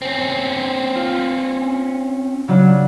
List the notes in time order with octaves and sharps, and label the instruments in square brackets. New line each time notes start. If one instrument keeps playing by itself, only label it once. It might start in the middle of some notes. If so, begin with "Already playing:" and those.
[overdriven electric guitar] C4 C#4
[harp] F4
C#3 F#3 D4